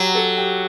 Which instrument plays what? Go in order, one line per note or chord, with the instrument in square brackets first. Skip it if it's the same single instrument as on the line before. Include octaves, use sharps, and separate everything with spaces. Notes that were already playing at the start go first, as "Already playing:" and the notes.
Already playing: [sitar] F#3 [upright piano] G4
[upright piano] A4
G4